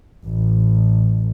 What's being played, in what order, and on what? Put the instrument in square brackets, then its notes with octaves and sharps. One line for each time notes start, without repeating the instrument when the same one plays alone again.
[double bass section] A1